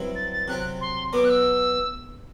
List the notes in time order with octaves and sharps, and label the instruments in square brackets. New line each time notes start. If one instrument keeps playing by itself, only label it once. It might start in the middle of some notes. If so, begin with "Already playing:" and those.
Already playing: [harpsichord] G2 F#3 C4 E4
[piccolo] A6
A6
[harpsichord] C3 F#3 C4 [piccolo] F#6
[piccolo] C6
[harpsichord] B2 F#3 B3 F#4 [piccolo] D6
[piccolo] F#6
E6